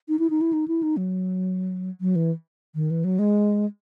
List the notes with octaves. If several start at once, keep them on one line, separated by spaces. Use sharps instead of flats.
D#4
E4
D#4
E4
D#4
E4
D#4
F#3
F#3
E3
D#3
E3
F#3
G#3